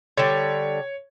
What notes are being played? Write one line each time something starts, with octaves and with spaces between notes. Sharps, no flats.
D3 G3 C#5